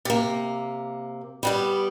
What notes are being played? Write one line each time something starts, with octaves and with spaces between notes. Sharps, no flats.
C3 A#3
G3 B3 G4